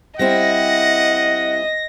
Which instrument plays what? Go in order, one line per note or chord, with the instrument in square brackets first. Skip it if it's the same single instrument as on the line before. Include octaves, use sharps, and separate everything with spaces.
[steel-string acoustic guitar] G3 C4 E4 [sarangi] D#5 [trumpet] F#5 [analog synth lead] A#6